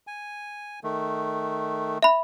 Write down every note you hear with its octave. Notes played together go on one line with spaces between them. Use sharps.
G#5
D#3 A3
E5 B5